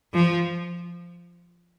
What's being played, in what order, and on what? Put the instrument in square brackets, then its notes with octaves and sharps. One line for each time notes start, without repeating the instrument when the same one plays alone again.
[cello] F3